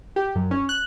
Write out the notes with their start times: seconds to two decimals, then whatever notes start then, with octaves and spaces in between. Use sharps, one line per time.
0.16 G4
0.35 F#2
0.51 C#4
0.69 F#6